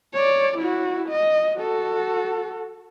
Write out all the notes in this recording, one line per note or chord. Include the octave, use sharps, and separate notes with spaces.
C#5 D5
E4 F#4
D#5
F#4 A4